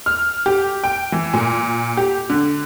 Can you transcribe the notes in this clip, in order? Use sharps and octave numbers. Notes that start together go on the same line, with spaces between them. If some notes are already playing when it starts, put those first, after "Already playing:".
F6
G4
G5
E3
A#2
G4
D3